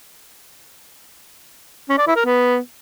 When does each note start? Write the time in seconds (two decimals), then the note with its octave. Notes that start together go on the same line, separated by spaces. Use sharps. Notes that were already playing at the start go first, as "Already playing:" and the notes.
1.89 C#4
1.98 D5
2.07 E4
2.16 A#4
2.25 B3